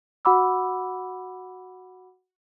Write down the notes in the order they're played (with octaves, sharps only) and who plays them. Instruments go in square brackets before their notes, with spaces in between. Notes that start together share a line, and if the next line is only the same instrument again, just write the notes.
[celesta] F#4 F#5 B5 D6 E6